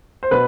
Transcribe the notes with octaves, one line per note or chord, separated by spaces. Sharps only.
C5
B2 B4